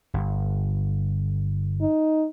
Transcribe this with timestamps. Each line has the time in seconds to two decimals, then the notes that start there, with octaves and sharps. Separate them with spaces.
0.14 G1
1.81 D#4